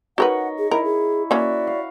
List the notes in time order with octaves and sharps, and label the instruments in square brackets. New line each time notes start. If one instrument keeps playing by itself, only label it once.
[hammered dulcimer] D#4 C#5 D#5 [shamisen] F#4 A#4 B4 [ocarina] F#5
[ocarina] G#4
[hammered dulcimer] E4 [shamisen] A#4 [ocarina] D#5
[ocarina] G#4
[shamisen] A#3 C#4 [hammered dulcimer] F#4 E5 [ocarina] D5
[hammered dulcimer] F5